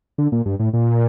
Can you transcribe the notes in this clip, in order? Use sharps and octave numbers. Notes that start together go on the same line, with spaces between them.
D3
A#2
G2
A2
A#2